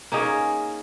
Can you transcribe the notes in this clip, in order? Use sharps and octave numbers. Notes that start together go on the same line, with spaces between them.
A#3 C#4 D#4 G#4